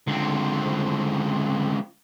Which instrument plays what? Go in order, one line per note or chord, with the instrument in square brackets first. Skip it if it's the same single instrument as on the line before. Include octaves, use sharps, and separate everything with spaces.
[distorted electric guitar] C#2 C4 [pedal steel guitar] D3